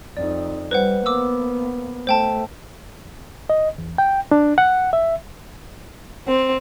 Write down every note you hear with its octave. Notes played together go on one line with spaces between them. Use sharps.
F2 D#4 D5
G3 B4 C5 F#5
A#3 B3 D6 E6
A3 C5 G5 A5
D#5
E2
G5
D4
F#5
E5
C4